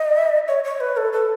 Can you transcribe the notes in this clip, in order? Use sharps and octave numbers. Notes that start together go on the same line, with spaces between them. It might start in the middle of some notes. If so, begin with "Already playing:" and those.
Already playing: D#5
C#5
C#5
B4
A4
A4